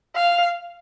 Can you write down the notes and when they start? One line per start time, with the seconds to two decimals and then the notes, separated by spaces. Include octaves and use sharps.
0.16 F5